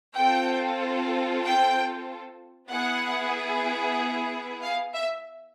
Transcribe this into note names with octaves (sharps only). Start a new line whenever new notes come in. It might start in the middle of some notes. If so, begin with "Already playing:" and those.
C4 F4 A4 G5
G5
B3 E4 G#4 F#5
F5
E5